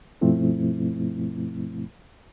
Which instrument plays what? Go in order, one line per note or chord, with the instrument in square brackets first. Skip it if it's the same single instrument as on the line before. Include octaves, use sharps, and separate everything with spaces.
[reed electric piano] G2 B2 F3 A3 C4 E4